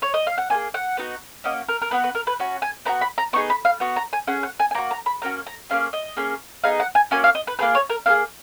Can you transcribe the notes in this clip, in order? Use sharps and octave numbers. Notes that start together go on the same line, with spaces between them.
C#5
D#5
F5
F#5
A#3 F4 G#4 G#5
F#5
B3 D#4 F#4
A#3 C#4 F#4 D#5
A#4
A#4
B3 F#4 B4
B4
A#4
B4
C#4 F#4
G#5
B3 D#4 F#4 A#5
B5
A#5
B3 D#4 G#4 C#6
B5
F5
B3 F#4
A#5
G#5
C#4 G#4 F#5
F#5
G#5
G#5
A#3 D#4 F#4 A#5
A#5
B5
A#3 C#4 F#4 A#5
A#5
A#3 C#4 G#4 F5
D#5
A#3 C#4 G#4
B3 D#4 G#4 F5
F#5
G#5
A#3 C#4 F#4 G#5
F5
D#5
B4
A#3 F4 G#4 B4
C#5
A#4
A#3 D#4 G#4 F5